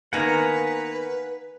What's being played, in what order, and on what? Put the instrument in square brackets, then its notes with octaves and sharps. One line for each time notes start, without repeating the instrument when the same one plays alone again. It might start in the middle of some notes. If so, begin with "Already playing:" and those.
[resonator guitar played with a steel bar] D#3 A#3 B3 [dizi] B4 [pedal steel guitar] F#5 G#5 A#5